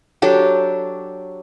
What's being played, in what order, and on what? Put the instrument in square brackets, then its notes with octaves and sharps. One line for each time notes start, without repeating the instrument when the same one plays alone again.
[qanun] F#3 D4 G4 A4